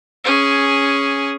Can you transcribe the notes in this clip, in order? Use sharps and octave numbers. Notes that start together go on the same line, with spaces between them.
C#4 G#4